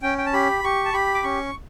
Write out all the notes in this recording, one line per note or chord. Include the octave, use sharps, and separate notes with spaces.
C#4 G5
G5
A5
G4 B5
G4 C#6
A5
G4 B5
D6
C#4 C#6